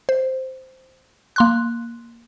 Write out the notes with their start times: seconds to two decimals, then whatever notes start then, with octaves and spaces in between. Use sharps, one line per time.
0.09 C5
1.36 A#3 C6 F#6